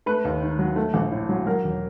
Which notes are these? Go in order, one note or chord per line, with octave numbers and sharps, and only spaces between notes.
A3 B4
D#2
D#3
F#3
A3
A#1
A2
F#3
F#3 A#4
E1